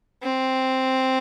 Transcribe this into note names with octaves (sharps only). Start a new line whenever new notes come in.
C4